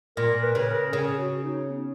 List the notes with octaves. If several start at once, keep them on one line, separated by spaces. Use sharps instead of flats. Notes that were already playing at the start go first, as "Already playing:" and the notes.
A#2 A#4
B4
C#3
A#4
C#3 G#4
F#4
D#4
B3